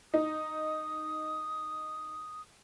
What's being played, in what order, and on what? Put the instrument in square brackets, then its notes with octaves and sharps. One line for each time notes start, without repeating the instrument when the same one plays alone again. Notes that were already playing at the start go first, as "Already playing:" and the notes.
[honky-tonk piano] D#4 [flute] D#6